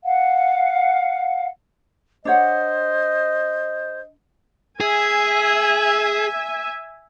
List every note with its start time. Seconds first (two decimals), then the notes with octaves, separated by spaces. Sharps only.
0.04 F5 F#5
2.25 D4 C5 C#5 D#5 F#5
4.81 G#4 E5 G#5